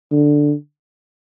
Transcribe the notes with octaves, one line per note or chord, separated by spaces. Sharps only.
D3